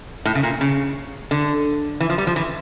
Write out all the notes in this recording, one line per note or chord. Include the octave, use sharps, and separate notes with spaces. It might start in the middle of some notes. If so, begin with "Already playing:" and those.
A2
C#3
A#2
C#3
D3
E3
F3
G3
F3
E3